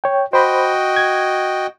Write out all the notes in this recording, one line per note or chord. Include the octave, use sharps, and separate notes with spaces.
C#5 G5
F#4 C5 D#5 G5 B5
G#6